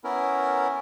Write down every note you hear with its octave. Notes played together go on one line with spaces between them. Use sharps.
B3 C#4 E4 A#4